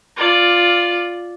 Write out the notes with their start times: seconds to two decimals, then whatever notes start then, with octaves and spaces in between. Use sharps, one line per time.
0.17 F4 D5